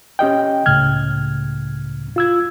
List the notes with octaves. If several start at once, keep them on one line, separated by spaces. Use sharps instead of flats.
C#4 G4 D#5 G5
C#2 A2 C#3 F6 G#6
F4 E6 G#6